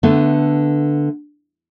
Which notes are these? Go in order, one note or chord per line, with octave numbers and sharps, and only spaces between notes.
D3 A3 B3